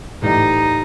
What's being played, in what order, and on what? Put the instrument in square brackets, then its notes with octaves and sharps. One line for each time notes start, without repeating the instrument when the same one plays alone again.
[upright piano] A2 E3 G3 [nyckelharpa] D#4